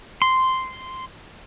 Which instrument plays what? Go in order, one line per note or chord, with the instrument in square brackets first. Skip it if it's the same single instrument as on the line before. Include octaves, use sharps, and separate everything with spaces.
[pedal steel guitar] C6